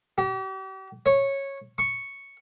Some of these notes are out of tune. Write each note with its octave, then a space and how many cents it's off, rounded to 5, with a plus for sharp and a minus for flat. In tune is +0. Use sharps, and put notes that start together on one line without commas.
G4 -40
C#5 -10
C#6 +0